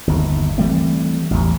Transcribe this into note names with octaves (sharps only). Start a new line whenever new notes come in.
G1 D#2
E3 G3 A3 C4
A1 E2